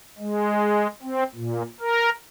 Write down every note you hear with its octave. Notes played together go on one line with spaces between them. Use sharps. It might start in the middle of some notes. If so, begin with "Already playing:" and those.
G#3
C4
A#2
A#4